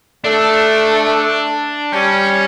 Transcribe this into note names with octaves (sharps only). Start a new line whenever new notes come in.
A3 D4
G3 C#4